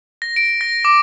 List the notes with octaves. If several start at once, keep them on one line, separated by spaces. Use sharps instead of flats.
A#6
D7
A#6
D6